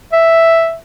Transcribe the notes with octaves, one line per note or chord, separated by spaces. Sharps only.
E5